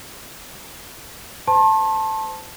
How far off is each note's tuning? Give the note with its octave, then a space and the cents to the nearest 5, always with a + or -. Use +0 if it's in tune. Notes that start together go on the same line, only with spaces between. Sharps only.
C5 -40 A5 +0 C6 +45